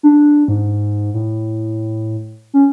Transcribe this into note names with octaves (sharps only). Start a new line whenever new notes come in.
D4
G#2
A2
C#4